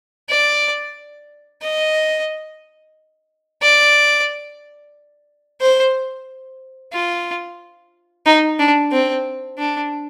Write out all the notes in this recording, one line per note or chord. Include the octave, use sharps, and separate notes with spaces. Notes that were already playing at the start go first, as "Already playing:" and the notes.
D5
D#5
D5
C5
F4
D#4
D4
C4
D4